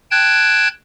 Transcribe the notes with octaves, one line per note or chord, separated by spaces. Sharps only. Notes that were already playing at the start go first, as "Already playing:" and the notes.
G5 A5 F#6 G#6